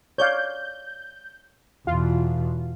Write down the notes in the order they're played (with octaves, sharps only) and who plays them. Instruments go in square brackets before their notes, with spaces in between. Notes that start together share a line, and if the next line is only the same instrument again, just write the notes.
[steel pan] C#5 D5 F5 [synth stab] G6
[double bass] E2 B2 [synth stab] F4